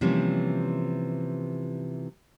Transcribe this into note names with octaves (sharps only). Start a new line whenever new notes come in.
C3 E3 F3 G3 A#3 C#4